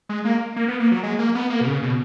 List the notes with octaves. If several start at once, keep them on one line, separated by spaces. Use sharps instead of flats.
G#3
A#3
A#3
B3
A#3
F#3
G#3
A#3
B3
A#3
B2
C#3
B2